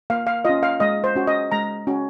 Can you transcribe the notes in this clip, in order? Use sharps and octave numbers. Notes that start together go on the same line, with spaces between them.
A#3 F5
F5
C#4 F4 D#5
F5
G#3 D#5
C5
C#4 F#4
D#5
G#3 A#5
C#4 F#4